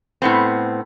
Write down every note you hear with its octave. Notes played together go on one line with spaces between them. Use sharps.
A2 B3 C4